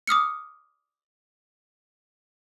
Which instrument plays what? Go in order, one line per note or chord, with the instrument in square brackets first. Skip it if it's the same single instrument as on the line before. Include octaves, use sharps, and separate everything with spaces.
[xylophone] D6 D#6 F6 C#7